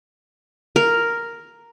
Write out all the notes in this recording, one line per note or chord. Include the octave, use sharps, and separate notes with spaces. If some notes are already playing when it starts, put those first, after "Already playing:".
A#4